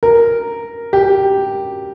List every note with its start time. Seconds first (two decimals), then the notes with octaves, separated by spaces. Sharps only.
0.03 A#4
0.93 G4